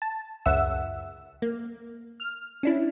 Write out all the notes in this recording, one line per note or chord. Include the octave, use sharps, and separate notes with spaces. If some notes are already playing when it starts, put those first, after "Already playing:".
A5
C#2 F#2 E5 F#5 E6
A#3
F6
C#4 D4 E4